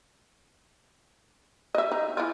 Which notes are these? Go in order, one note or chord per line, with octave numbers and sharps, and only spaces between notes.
D#5 E5
D#4
E3 E4 F4